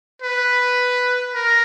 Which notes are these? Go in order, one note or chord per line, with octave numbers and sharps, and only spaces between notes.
B4
A#4